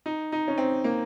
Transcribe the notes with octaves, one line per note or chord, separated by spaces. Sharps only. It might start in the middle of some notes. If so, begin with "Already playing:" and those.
D#4
D#4
C#4
C4
A#3